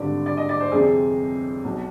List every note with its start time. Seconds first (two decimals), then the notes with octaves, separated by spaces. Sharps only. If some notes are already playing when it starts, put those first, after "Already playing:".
Already playing: G#1 G2 D3 D5
0.26 D5
0.37 D#5
0.49 D5
0.60 C5
0.72 G1 F2 C3 G#4
1.64 B1 B2